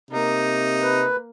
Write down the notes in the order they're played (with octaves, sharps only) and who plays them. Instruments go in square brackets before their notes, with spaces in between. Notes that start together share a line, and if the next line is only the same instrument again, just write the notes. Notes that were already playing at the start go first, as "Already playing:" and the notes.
[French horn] C3 [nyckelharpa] A#3 [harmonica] D#4
[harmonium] B4